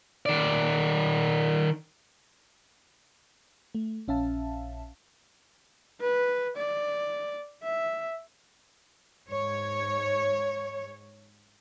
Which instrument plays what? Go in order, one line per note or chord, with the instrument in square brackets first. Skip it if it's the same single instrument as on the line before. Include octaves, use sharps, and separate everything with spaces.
[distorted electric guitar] D#3 D5
[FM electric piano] A3
A#1 C#4 E5 F5 A5
[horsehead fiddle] B4
D5
E5
[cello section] G#2 C#5